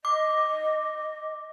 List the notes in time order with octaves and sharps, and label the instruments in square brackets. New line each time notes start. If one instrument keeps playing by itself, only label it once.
[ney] D#5 [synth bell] D6